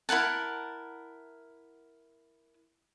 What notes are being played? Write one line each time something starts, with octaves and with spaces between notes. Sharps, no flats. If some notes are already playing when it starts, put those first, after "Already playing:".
E4 A#4 F#5 A5